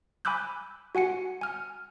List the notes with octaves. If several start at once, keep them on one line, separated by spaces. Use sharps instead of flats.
G#5 B5 D6 E6 F#6 G6
F#4 F#5 G#5 C#7
G#5 F6